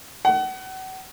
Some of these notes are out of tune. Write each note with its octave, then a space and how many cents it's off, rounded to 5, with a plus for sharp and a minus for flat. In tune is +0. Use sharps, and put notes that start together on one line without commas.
F#5 +35